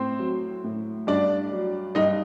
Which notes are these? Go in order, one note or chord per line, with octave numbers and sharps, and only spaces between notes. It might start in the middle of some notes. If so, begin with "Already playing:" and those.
Already playing: A2 C4 C5
F#3
A2
G2 D4 D5
F#3
G2 D#4 D#5